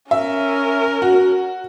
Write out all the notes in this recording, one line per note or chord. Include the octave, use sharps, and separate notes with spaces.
C#4 A#4 E5
F#4